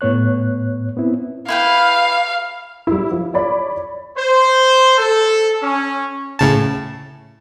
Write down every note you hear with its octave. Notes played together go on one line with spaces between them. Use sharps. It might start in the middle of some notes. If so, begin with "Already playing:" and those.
A2 B3 C#5 F#6
B3 C4 E4
E4 B4 F5 G5
G3 E4
F3
C#5 D5 B5
C5
A4
C#4
A2 C#3 A5